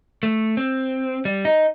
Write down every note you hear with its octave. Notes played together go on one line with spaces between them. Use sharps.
A3
C4
G3
D#4